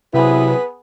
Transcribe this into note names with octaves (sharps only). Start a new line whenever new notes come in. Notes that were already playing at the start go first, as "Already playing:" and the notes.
C3 F#3 B3 E4 G#4 B4